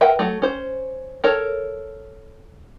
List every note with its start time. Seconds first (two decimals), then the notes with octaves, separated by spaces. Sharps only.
0.01 A#4 B4 E5 F#5 G5
0.19 F#3 A3
0.42 C#4 C5
1.24 A4 A#4 C#5